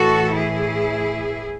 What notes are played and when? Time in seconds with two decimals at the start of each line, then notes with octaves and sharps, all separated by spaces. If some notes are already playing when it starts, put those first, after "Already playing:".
Already playing: A2 E3 F#4 A4
0.33 E4 G#4